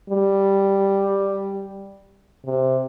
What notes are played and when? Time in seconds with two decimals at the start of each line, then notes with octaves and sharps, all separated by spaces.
0.10 G3
2.46 C3